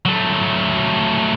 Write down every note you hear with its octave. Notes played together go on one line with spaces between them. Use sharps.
F#3 A3